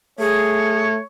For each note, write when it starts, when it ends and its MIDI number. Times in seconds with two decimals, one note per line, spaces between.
0.20 0.99 57
0.20 0.83 68
0.20 1.02 73